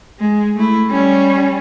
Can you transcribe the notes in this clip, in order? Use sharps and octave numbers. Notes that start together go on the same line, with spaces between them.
G#3
A3 E4
G3 C#4